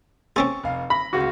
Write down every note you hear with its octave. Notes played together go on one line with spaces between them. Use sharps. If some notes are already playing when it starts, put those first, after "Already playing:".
C4 C#4 G#4 C#6 E6 A6
F1 F5
B5 A#6
C#2 C#3 F#4